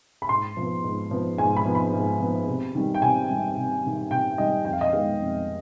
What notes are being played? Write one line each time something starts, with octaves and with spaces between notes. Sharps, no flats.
B5
G#2 C6
F3 B3
G#2
F3 B3
G#2 G#5
B5
F3 B3
B5
G#2
F3 B3
C3
D#3 G3
G5
C3 G#5
D#3 G3
C3
D#3 G3
C3 G5
D#3 G3 D#5
F2 G5
F5
D#5
D#3 G#3 B3 F5
F2